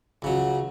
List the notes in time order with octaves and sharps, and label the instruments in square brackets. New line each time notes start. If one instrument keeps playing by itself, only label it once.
[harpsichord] C#2 C#3 F#3